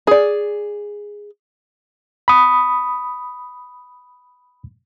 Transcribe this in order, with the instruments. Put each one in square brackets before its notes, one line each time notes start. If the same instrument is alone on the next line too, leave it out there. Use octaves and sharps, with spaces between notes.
[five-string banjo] G#4 D5
[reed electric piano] B5 D#6